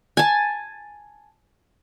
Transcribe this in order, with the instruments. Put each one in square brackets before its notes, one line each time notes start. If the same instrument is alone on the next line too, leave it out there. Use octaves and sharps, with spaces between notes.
[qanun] G#5 A5